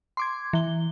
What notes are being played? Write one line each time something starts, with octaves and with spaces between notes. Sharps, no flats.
C6 D6 G#6
E3 G7